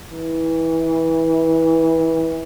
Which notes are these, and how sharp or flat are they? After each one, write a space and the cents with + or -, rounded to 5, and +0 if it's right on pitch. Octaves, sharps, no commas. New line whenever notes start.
E3 -20